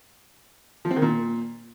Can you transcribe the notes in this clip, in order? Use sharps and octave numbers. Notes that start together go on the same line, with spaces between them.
F3
C4
D#3
A#2